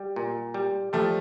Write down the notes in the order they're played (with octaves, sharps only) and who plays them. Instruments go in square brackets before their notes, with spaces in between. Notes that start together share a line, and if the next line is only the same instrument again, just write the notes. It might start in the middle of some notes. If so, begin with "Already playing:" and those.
Already playing: [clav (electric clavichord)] G3
A#2
G3
[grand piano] F3 A3 [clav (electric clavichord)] G3